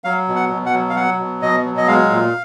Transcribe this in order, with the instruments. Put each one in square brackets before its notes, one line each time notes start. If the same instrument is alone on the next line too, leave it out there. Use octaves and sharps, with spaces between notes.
[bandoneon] F#3 F5
B2
F#5
B2
F#5
F#3
F5
F#3 F#5
B2
B2 D#5
F#3
D#5
G#3 F5
A#2